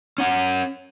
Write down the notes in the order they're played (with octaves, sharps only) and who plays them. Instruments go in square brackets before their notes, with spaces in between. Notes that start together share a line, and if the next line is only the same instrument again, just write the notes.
[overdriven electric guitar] C#4 F#5